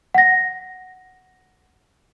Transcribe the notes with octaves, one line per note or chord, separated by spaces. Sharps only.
F#5 A#6